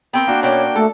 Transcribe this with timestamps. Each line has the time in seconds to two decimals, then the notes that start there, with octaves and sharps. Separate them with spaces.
0.13 B3 C4 A#4 G5
0.28 A#3 D4 F#4
0.43 B2 C#4 C#5 D5 G5
0.75 A3 A4